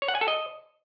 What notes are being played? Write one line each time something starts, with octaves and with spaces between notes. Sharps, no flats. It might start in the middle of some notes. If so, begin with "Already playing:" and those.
C#5
F#5
G#5
A4
D#5